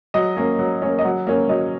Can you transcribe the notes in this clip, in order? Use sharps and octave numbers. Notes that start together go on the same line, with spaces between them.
F#3 D#5
A#3 C#4
F#3
A#3 C#4
D#5
F#3 F#5
A#3 C#4
F#3 D#5